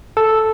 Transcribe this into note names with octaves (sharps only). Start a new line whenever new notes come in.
A4